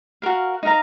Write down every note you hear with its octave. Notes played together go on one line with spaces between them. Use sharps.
F#4 A#4 F5
D#4 A#4 F5 A#5